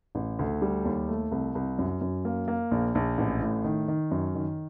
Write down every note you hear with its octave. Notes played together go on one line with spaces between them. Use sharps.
A1
D2
G3
D#2
A3
C2
C2
F#2
F#2
A#3
A#3
A#1
A#1
A1
A2
D#3
D#3
F#2
D#3